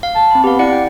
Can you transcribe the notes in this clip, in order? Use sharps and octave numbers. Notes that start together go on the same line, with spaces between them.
F5
A5
C4 B5
B3 G4 F5
E4 D5 F#5 C#7
G5